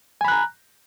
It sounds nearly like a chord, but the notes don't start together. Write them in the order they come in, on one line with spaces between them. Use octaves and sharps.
G#5 B5 F#6 A#5